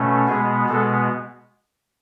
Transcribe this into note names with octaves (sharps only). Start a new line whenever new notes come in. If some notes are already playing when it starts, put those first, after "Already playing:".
Already playing: B2 A3 C#4
B2 G#3 B3 G#4
B2 G#3 B3 A4